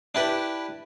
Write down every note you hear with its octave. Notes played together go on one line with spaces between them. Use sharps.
D4 E4 G4 B4